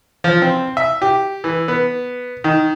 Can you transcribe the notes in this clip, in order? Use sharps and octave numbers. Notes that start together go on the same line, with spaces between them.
F3
C4
E5
G4
E3
B3
D#3